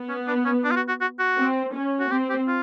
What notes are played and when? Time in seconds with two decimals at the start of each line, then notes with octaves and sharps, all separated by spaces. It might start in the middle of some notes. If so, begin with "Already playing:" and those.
Already playing: B3
0.09 C#4
0.28 D4
0.45 C#4
0.64 D4
0.71 F4
0.76 F#4
0.88 F#4
1.01 F#4
1.19 F#4
1.38 C4
1.74 C#4
2.00 F#4
2.11 C4 G4
2.30 G4
2.48 F4